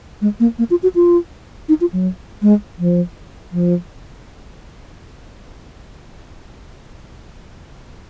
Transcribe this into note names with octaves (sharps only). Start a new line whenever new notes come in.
G#3
A#3
A#3
F4
F#4
F4
D#4
F4
F#3
G#3
F3
F3